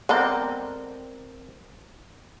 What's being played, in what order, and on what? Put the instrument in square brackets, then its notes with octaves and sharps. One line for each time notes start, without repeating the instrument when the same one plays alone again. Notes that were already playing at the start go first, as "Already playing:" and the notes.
[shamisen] G#3 B3 A4 [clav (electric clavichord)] C4 A#4 D5